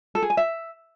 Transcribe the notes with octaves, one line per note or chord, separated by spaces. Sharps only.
A4
G#4
G#5
E5